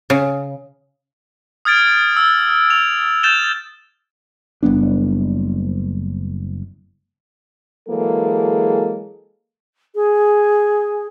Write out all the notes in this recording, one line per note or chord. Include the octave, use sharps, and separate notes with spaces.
C#3
D#6 F6 G#6 A6 D7
E6
F7
G6 A6 E7 F7 G7
F#1 G3 B3 D4
E3 F#3 G#3 A#3 G#4 A4
G#4